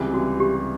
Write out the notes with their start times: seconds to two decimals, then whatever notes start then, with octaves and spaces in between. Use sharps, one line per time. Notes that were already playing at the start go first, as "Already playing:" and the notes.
Already playing: C#2 C3 E3 G3
0.14 F#4
0.40 G4